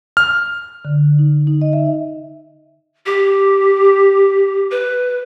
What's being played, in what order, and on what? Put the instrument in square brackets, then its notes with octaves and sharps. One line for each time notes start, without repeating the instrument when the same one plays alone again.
[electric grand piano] F6
[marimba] D3
D#4
D#4
D#5
E5
[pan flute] G4
B4